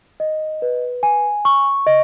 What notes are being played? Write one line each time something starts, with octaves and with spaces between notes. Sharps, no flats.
D#5
B4
G#5
C#6
D#5